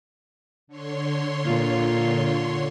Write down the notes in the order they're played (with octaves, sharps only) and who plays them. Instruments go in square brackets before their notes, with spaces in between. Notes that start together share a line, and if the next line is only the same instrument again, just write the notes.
[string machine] D3 C#5 C6
[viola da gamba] A#2 F4